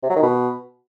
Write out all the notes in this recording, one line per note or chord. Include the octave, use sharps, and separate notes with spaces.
C3
F#3
D#3
B2